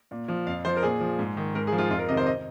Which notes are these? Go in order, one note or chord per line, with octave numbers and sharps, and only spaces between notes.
A#2
F3
F2 F5
F3 C5
A#4
A#2 G#4
F3
G#2
D#3
G#2 A#4
G#4
F3
F4
F2 F4
A#4
C3 D#3 D#5
C5
D#5